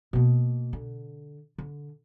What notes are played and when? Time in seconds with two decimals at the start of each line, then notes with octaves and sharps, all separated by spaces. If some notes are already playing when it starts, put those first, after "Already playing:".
0.13 B2 A#3
0.73 D3
1.58 D3